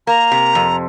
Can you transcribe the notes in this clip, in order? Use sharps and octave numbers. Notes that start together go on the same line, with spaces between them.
A#3 A#5
C3
F2